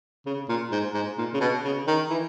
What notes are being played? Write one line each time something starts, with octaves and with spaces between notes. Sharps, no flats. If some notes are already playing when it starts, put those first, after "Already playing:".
C#3
A#2
G#2
G#2
A#2
C#3
B2
C#3
D#3
E3